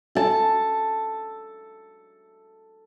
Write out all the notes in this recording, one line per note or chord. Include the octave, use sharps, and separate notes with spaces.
A4 A5